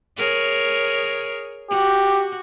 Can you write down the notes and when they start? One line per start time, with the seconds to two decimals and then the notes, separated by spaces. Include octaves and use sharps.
0.17 G#4 A#4 C#5
1.70 F#4 G4